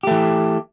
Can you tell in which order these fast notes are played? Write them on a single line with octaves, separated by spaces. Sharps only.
G4 A3 E3